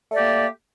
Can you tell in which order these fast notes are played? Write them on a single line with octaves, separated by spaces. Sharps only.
A3 D5 G4 A#3